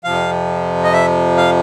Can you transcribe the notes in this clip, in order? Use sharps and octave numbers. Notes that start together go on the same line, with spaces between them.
F2 C3 F3 F5
D#5
E5
F5